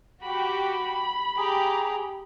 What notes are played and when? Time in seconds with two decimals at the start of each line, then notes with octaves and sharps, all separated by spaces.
0.22 F#4 G4 B5
1.38 G4 G#4 A#5